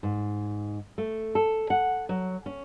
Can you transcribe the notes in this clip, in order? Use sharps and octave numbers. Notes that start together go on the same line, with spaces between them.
G#2
A3
A4
F#5
F#3
C#4